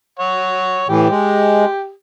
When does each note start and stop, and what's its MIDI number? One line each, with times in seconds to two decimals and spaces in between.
0.19 0.84 73
0.19 0.84 78
0.89 1.08 45
0.89 1.08 52
0.89 1.91 67
1.10 1.65 56